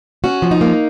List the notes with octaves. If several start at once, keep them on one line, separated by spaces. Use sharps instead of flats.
C#4 F#4
F3
D#4
A#3